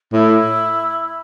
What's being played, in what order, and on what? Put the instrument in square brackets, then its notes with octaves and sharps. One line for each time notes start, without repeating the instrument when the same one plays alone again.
[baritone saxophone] A2 [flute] E4